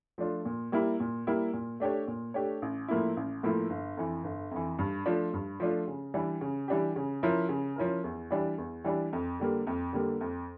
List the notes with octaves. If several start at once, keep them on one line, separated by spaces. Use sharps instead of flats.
F3 A3 D4 F4
A#2
G3 A#3 E4
A#2
G3 A#3 E4
A#2
A3 D4 G4 C#5
A#2
A3 D4 G4 C#5
A1
A2 F3 A#3 E4
A1
A2 F3 A#3 E4
G1
F2 E3
G1
F2 E3
G2
F3 A3 D4 F4
G2
F3 A3 D4 F4
C#3
E3 G3 D4 G4
C#3
E3 G3 D4 G4
C#3
F3 C#4 E4 A#4
C#3
F3 C#4 E4 A#4
E2
E3 G3 D4
E2
E3 G3 D4
F2
D3 G3 A#3
F2
D3 G3 A#3
F2